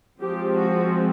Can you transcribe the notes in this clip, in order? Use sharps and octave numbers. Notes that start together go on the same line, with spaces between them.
F3 G#3 C4 G4
F#4